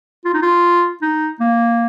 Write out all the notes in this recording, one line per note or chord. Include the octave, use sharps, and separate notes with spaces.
F4
D#4
F4
D#4
A#3